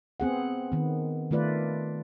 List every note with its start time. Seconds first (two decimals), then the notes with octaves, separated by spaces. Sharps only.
0.20 B3 C4 G#4 F#5
0.72 D#3 B3
1.31 D#3 A3 F4 B4 D5